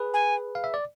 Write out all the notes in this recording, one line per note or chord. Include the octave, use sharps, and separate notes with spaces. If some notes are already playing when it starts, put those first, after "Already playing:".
Already playing: G#4 B4
G#5
F5
E5
D5